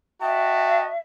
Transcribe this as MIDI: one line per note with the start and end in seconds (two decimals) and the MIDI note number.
0.21 0.91 66
0.21 0.91 75
0.21 0.98 76
0.21 0.84 79
0.21 0.91 81